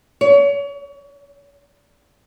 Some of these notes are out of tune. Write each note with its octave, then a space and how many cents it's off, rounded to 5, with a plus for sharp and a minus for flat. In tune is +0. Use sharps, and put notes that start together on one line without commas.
C#5 +35